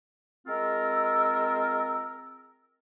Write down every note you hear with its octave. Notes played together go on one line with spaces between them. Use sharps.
G#3 C4 F4 A#4 E6